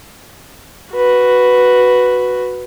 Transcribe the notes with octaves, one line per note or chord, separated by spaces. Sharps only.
F#4 B4